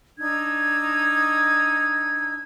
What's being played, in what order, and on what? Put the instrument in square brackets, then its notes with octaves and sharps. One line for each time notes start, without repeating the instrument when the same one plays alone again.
[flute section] D4 D#4 E6 G#6